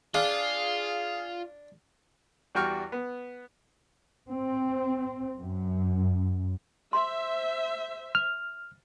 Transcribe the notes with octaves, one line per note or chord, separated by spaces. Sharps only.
D4 F4 G#4 F5
E2 G3 F#4 G5 C#6 F6
B3
C4
F#2
C5 E5 C6
F6